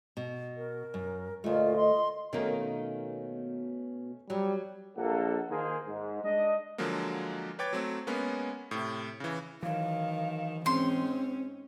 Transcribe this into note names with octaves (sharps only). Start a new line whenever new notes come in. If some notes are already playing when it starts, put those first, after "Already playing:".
B2
A#4
F#2
D2 A#2 A3 F4 D#5
D#5 C6
B2 D#3 A3 A#3 C#4
F#3 G3
A#1 A#3 A4 F#5
D#3 A#3 G#4 C5
G#2
G#3 D4 D#5
D3 F3 F#3 G#3 A#3
B4 C#5 G5 D6 G#6 A6
F#3 A3 C4
G#3 A#3 B3 C#4
A2 C3
C#3 E3
D#3 E3 F#3 F5
G#2 C4 C#4 C6